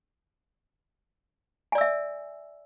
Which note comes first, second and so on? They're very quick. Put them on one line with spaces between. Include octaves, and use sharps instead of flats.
G#5 D5 E6 E5